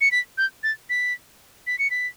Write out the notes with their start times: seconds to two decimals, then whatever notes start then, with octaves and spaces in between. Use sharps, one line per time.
0.01 C#7
0.11 B6
0.38 G6
0.63 A6
0.90 B6
1.67 B6
1.79 C#7
1.91 B6